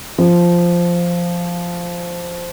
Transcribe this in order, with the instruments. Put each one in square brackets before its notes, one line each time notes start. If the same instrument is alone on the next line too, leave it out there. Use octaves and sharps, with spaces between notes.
[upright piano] F3